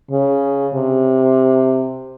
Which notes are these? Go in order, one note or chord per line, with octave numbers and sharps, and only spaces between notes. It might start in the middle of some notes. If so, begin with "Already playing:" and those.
C#3
C3